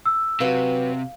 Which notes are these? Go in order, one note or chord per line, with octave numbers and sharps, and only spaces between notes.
E6
C3 F#3 B4 C#5 F5